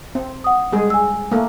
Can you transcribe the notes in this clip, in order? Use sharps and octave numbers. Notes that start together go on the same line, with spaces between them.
C4
F#5 D#6
G3 G#3 G#4
G#5 E6
A3 A#3